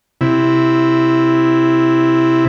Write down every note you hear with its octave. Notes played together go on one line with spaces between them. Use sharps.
C3 E4